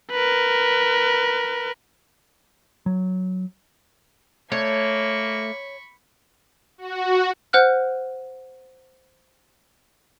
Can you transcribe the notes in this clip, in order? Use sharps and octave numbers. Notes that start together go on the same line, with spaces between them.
A#4 B4
F#3
A3 A#3 C#5 B5 C#6
F#4
C5 F#5 F6 F#6